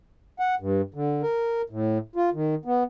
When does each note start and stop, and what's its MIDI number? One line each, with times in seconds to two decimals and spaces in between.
0.39 0.55 78
0.60 0.81 43
0.94 1.22 50
1.23 1.62 70
1.70 1.98 45
2.16 2.30 65
2.34 2.55 51
2.65 2.83 59